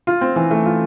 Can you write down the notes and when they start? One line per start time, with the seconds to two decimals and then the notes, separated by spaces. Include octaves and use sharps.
0.07 F4
0.21 C4
0.36 E3
0.51 A3
0.66 F4